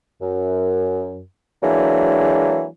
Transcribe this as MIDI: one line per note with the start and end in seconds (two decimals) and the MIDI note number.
0.22 1.23 42
1.63 2.66 52
1.63 2.66 54
1.63 2.66 56
1.63 2.66 58
1.63 2.66 62